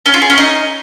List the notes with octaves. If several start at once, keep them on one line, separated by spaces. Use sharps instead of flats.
C#4
F4
G#4
C#4
D#4